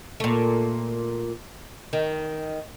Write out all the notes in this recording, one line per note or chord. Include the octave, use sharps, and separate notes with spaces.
A#2 A3
D#3